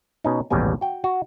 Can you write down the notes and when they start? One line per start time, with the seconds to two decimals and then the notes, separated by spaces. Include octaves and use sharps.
0.24 B2 C#4 D#4
0.50 A1 D#2 G#2 B2 G3 G#5
0.81 F#4 G5
1.04 F#4